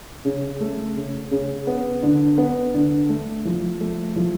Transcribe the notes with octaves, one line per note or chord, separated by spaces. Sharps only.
C#3
A3
C#3
C#3
B3
D3
B3
D3
A3
F3
A3
F3